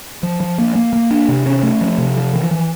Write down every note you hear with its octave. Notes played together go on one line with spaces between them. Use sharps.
F3
F3
A#3
A#3
A#3
D4
C3
C#4
A3
F3
C3
F3
E3
E3